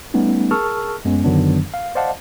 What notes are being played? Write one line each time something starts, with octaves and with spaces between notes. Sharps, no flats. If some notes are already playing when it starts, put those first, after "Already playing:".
G3 A3 B3 C#4 D#4
G#4 A#4 A5 C#6 E6 F6
F#2 G#3 B3 C#4
F#2 D3 D#3 F#3 B3 D4
F5
C5 D5 D#5 F5 F#5 A5